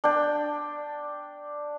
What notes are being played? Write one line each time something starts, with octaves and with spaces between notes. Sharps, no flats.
D4 G5